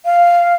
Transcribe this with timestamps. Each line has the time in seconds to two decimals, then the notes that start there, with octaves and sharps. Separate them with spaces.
0.05 F5